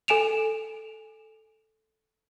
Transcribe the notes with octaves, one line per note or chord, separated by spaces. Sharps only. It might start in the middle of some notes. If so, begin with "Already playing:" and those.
A4 G#5 D7 E7 F7